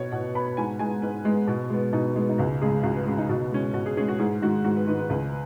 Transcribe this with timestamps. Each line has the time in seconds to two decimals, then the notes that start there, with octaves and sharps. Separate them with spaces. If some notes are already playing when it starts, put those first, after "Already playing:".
Already playing: B2 B3 C#5
0.12 B2 F#5
0.34 B3 B5
0.57 G#2 G#5
0.79 G#3 B3 G#5
1.02 G#2 B4
1.25 G#3 B3
1.48 B2
1.70 G#3 B3
1.93 B2 D#4
2.16 G#3 B3
2.29 D#4
2.38 C#2 F#4
2.62 C#3 G#3 G#4
2.83 C#2 F#4
2.95 B4
3.06 C#3 G#3 F#4
3.18 D#4
3.29 B2 F#4
3.51 G#3 C#4
3.74 B2 F#4
3.86 G#4
3.97 G#3 C#4 G#4
4.08 F#4
4.19 G#2 G#4
4.42 D#3 G#3 F#4
4.64 G#2 F#4
4.76 B4
4.87 D#3 G#3 B4
4.99 B4
5.10 C#2 B4